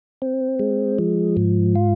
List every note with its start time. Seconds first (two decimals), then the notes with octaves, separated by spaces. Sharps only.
0.22 C4
0.59 G#3
0.98 F3
1.37 G#2
1.75 F4